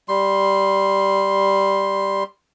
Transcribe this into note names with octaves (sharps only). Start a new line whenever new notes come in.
G3 C6